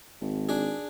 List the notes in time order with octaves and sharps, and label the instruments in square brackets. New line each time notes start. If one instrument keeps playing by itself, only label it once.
[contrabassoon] G#1
[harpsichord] D4 G#4